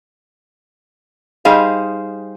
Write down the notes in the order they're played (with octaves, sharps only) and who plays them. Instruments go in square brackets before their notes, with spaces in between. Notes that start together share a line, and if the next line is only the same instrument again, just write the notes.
[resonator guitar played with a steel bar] G3 D#4 G#4 C5 F5